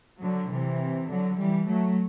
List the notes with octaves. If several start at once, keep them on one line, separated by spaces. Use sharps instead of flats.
D3 F#3
C3 E3
D3 F#3
E3 G3
F#3 A3